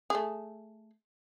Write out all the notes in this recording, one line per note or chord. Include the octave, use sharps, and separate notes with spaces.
A3 G#4